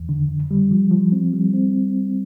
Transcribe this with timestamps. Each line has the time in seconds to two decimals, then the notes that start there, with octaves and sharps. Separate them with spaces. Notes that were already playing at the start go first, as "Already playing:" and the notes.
Already playing: E2
0.09 D3
0.29 F2
0.51 G3
0.71 F3
0.91 F3
1.12 C4
1.33 G3
1.54 C4